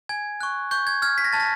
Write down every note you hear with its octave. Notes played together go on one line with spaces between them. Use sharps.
G#5 G#6
C#6 F#6
C#6 G6
G#6
F6 G#6
B6
A#6
A5 A6
A#6